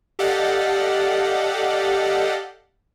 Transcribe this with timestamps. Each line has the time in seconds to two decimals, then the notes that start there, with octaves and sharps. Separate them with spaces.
0.19 G4 A4 D5 D#5 F5 F#5